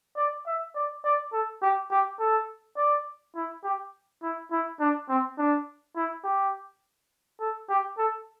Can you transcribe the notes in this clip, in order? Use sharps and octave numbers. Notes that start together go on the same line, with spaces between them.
D5
E5
D5
D5
A4
G4
G4
A4
D5
E4
G4
E4
E4
D4
C4
D4
E4
G4
A4
G4
A4